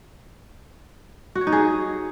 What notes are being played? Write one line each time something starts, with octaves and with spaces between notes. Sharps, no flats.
F#4
C#5
D#4
G#4